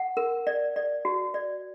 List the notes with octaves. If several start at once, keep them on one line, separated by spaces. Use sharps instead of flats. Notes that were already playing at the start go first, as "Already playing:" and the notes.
Already playing: F#5
A#4
D5
D5
F#4
D5